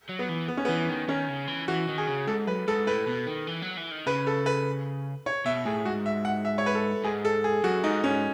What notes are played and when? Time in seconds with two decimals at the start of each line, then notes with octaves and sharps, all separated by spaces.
0.09 F#3
0.19 B3
0.29 E3
0.48 B3
0.57 C#4
0.65 B3
0.69 E3
0.89 D#3
1.08 D#3 C#4
1.29 C#3
1.48 E3
1.68 E3 F#4
1.88 D#3
1.98 G#4
2.08 C#3
2.27 G#2 A4
2.47 F#2 B4
2.68 G#2 A4
2.87 A2 B4
3.07 B2
3.27 D#3
3.47 E3
3.62 F#3
3.77 E3
3.91 D#3
4.06 C#3 B4
4.27 A4
4.46 B4
5.26 C#5
5.46 B2 E5
5.65 A2 G#4
5.85 G#2 F#4
6.06 E5
6.25 F#5
6.45 E5
6.58 C#5
6.66 B4
6.75 A4
7.04 G#2 G#4
7.25 A4
7.44 G#4
7.64 F#2 F#4
7.84 G#2 D#4
8.04 G#2 C#4